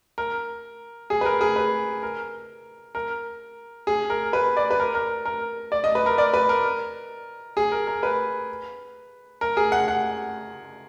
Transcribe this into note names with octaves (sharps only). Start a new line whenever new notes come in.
A#4
G#4
B4
A#4
G#4
B4
A#4
A#4
G#4
A#4
B4
D5
B4
A#4
A#4
A#4
D5
D#5
B4
A#4
D5
B4
A#4
G#4
A#4
A#4
B4
A#4
G#4
F#5
F#5